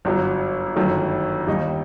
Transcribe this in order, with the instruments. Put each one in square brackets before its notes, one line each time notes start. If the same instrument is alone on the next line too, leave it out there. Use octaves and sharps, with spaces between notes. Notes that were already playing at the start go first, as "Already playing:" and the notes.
[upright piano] G1 F#2 F#3
G1 F#2 D#3 A3
D#2 D#3 G3 D#4